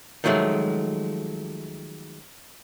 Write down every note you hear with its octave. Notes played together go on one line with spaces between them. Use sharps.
D#3 F3 F#3 G#3 A3